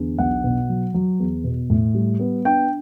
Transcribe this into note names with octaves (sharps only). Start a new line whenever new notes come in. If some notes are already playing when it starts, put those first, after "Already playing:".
Already playing: E2 D3
B1 F#5
B2
F#3
F#3
E2
B2
A2
G3
B3
D4 G5